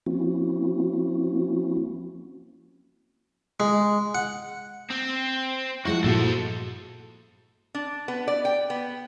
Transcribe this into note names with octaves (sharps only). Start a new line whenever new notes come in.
F3 A#3 C4 C#4 E4 F#4
G#3
F#5
C4
F3 G#3 E4 F#4 F#5
G2 A#2 F#4 A4 C5
D4
B3
D5
G5
B3